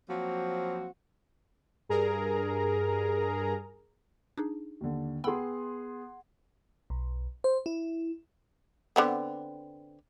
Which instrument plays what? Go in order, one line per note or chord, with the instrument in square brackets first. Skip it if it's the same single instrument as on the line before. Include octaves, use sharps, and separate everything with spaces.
[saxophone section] F3 F#3 A#3 C4 F#4
[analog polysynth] G2 G#4 A#4 A#5
[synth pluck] D4 D#4 G#4
[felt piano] D#2 D3
[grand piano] B3 G#4 [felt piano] F#5 C6 [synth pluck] G5 B5 E6
[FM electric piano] B1
C5
E4
[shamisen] D3 B3 C4